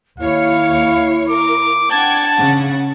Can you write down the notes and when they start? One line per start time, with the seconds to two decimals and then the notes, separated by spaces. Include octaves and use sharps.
0.20 D#2 E4 C#5 F5 C#7
1.30 A#4 D6
1.91 D4 F#5 G5 A5 G#6
2.36 C#3 F#5